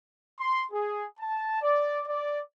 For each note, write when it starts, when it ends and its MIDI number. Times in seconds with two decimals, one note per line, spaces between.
0.39 0.65 84
0.72 1.06 68
1.20 1.60 81
1.62 2.03 74
2.08 2.41 74